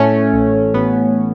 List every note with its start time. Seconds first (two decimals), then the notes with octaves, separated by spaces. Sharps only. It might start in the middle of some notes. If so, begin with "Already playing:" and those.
Already playing: A2 A3 C#4
0.34 A1
0.74 A1 B3